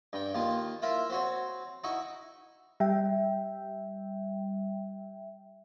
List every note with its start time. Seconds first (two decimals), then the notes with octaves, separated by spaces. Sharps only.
0.13 G2 G5
0.34 D#2 D#3 F4 A5
0.82 E4 F4 A#4 E5
1.10 C4 F#4 C#5
1.84 D#4 E4 F#4 C#6
2.80 G3 E5 G5